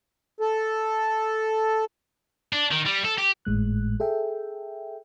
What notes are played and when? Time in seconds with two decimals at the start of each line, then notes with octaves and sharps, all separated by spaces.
0.40 A4
2.53 D4
2.71 D#3
2.86 G3
3.05 A4
3.18 G4
3.45 G#1 A2 G#3 F#6
4.00 G#4 A4 E5 G5